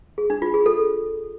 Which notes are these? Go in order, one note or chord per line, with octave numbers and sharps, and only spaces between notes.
G#4
D4
F4
G#4
A4